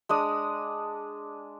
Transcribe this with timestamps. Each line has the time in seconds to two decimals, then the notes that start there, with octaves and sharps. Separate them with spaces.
0.09 G#3 D4 D#6